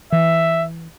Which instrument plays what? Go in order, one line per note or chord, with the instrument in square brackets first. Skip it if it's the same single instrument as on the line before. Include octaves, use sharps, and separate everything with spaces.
[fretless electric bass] E3 [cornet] E5